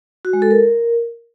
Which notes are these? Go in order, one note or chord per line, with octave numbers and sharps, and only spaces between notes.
F#4
G#3
A4
A#4